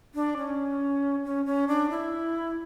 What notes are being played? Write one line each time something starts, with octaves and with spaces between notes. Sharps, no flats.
D4
C#4
C#4
C#4
D4
E4